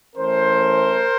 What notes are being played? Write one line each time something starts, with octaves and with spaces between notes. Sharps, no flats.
E3 A3 C#4 A#4 C5